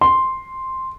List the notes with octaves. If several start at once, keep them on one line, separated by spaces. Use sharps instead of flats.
C6